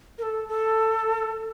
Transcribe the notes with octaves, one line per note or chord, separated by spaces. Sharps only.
A#4
A4
A4